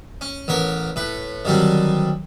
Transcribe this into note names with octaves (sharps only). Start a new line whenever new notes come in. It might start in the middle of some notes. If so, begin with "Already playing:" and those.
C#4
A1 B3 A#4 C#5
A2 B4
D3 D#3 F#3 G3 C4